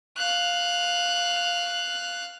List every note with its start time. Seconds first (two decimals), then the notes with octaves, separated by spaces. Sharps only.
0.17 F5 F#6